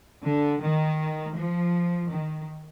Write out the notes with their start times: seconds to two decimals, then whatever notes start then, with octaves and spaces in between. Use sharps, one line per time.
0.24 D3
0.61 D#3
1.35 F3
2.09 D#3